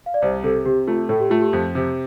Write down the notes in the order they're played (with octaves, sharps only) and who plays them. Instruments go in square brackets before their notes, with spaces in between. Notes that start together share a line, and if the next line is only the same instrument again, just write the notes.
[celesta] F5
D5
[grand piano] C2 [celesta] C5
[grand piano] C3 [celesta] A4
[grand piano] C3 [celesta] G4
[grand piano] A3 [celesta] F4
[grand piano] A2 [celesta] A4
[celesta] G4
[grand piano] A3 [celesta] F4
[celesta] G4
[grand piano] F2
C3